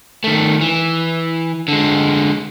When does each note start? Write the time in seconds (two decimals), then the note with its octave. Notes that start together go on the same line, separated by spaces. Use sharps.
0.24 D#3 A3
0.61 E3
1.68 D3 G#3